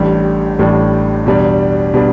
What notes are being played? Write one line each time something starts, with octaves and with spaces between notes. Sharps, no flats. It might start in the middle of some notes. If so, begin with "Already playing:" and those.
Already playing: A1 A2 G3 D4
A1 A2 G3 D4
E2 B2 G3 D4
B2 G3 D4